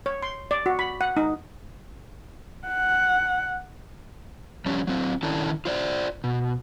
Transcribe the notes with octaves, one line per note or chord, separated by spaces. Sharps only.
C#5
C6
D5
F#4
B5
F#5
D#4
F#5
F3 G3 C#4
F#3 C4
D#3 C#4 D4 E4 A4
F4 C5 D5
B2